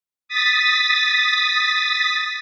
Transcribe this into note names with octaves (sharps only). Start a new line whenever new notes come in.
D#6 A6 B6